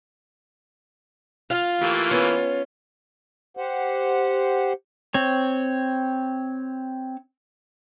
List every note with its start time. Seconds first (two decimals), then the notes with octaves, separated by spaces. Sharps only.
1.50 F4 F5
1.81 E3 A3 A#3 G4 E5
2.11 B3 C#4
3.57 G4 C5 F#5
5.14 C4 C#5